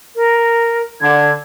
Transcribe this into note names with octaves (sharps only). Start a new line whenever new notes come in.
A#4
D3 G#6